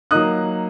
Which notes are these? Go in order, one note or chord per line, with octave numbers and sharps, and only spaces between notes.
F#3 A#3 D#4 D#6 F#6